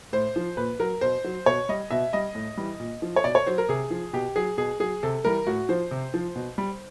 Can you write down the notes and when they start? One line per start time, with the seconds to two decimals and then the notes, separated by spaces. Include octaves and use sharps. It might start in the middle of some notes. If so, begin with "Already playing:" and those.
0.13 A2 C5
0.36 F3
0.57 A#2 B4
0.80 F#3 A#4
1.01 B2 C5
1.24 F#3
1.46 B2 C#5
1.69 G3 D#5
1.91 B2 E5
2.13 G3 D#5
2.35 A2
2.57 E3 G3
2.80 A#2
3.02 F3
3.16 C#5
3.24 B2 D5
3.35 C#5
3.46 F#3 C5
3.58 A#4
3.69 C3 G#4
3.91 F3
4.13 B2 G4
4.36 F#3 G#4
4.57 B2 G#4
4.80 F#3 G#4
5.03 C3 A4
5.25 E3 G3 A#4
5.47 A2 F#4
5.69 F3 C5
5.91 C3
6.14 F3
6.35 B2
6.58 G3